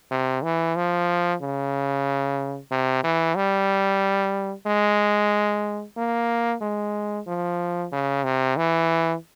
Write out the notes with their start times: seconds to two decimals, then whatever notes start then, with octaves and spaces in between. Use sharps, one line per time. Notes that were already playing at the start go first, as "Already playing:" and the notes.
0.11 C3
0.43 E3
0.76 F3
1.41 C#3
2.71 C3
3.04 E3
3.36 G3
4.66 G#3
5.97 A#3
6.61 G#3
7.27 F3
7.92 C#3
8.24 C3
8.57 E3